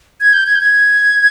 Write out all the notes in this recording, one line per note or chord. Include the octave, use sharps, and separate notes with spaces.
G#6
G6
G#6
G6
G#6